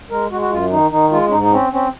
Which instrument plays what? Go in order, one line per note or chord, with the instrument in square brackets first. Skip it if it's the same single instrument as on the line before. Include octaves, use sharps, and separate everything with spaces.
[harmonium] G#3 A#4
G#3 F#4
F#4
F#2 F4
D#3 D#4
D#3 D#4
G#3 F4
C#4
G#2 D#4
D#4
C4 C#4
C4 C#4